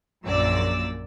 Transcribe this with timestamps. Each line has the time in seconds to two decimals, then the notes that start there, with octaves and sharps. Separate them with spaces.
0.25 A#1 F#2 A#2 D5 E6